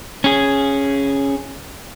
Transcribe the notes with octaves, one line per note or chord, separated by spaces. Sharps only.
C#4 G#4